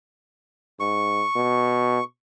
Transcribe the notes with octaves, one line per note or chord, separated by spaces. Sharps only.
G#2 C#6
B2